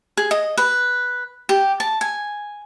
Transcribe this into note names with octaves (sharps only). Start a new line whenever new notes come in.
G#4
D#5
B4
G4
A5
G#5